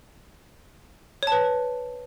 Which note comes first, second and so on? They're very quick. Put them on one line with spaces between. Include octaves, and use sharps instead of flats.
C#5 A5 B4